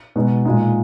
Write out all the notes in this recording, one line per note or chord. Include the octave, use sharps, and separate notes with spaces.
B2 G#3 D#4 F#4
A#2 G#3 D#4